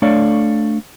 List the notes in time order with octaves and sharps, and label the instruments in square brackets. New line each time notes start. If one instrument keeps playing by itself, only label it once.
[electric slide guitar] A3 D4 A4 C#5 D5 F5